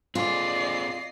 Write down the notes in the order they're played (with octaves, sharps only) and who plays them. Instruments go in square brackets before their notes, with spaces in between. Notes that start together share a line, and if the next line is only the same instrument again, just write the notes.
[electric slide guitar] C4 G#4 A4 [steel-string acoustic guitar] F4 [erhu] D5 [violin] D#5 C7